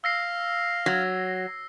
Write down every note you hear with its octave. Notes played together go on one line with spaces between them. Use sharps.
F5 E6 A#6 C7
F#3